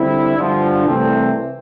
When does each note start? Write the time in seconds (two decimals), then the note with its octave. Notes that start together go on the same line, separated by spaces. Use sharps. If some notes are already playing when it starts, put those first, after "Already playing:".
Already playing: D3 G3 C4 E4
0.35 G2 D3 F3
0.84 C2 C3 E3 A3 C4